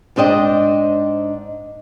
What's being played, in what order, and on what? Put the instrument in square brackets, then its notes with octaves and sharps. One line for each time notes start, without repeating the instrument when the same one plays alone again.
[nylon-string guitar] G#2 D4 C5 D#5 G5